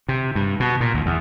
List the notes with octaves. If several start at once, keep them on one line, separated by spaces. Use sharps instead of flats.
C3
G2
B2
A#2
D2
E2